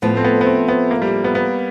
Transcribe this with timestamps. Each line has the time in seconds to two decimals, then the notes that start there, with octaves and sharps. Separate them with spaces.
0.02 A2 F3 A3 B3
0.17 C4
0.24 B3
0.41 B3
0.46 C4
0.68 B3
0.91 A#3
1.02 G3
1.24 B3
1.35 B3